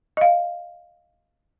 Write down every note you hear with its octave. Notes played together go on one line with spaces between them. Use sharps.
D#5 F5